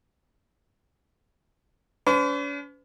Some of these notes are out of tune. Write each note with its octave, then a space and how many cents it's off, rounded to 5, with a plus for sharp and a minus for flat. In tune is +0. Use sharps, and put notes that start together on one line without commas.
C#4 +45 B4 +45